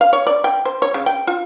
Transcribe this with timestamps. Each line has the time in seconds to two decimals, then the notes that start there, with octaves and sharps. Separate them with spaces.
0.01 F5
0.13 C#5
0.27 D5
0.44 G5
0.65 C5
0.82 C#5
0.94 C#3
1.06 G5
1.27 F4